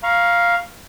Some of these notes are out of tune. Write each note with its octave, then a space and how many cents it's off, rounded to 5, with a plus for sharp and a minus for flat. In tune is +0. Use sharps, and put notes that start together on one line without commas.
F5 +0 A#5 +25 C#6 +0